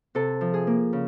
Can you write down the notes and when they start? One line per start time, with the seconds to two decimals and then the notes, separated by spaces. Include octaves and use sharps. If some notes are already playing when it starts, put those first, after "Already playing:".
0.15 C3 A4
0.41 F3
0.54 G#4
0.67 A#3
0.93 C#3